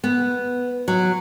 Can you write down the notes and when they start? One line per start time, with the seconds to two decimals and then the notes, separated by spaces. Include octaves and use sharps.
0.04 B3
0.88 F#3